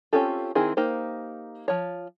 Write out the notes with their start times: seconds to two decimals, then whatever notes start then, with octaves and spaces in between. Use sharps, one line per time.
0.13 C4 C#4 F4 G4 A4
0.55 D#3 C4 E4 G#4
0.77 A#3 D#4 G4 C5
1.68 F3 C#5